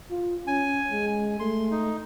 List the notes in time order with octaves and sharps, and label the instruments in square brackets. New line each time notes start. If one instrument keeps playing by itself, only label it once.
[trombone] F4
[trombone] C#4 [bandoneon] G#5
[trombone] G#3
[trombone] A3 [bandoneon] C6
[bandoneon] D#4